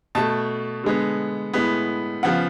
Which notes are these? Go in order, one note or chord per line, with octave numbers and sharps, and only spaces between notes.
B2 A3 A5
D3 G#3 B3
A2 G#3 B3
C#3 F3 B3 F#5